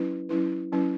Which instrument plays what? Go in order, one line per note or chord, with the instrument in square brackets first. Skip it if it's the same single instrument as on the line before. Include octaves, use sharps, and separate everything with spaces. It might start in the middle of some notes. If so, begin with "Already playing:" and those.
Already playing: [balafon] F#3 C#4 E4 B4
F#3 C#4 E4 B4
F#3 C#4 E4 B4